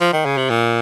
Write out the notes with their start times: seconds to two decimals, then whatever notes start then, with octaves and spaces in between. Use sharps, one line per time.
0.01 F3
0.13 D#3
0.25 C#3
0.38 C3
0.50 A#2